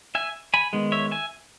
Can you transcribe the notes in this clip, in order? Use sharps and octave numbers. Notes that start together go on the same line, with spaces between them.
E5 G#5
G#5 B5
D#3 G#3 B3
C#5 E5
E5 G#5